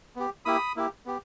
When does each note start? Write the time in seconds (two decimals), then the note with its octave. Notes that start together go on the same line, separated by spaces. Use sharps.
0.16 B3 G4
0.45 A#3 E4 G4 B5 D#6
0.76 A#3 E4 G4
1.06 B3 G4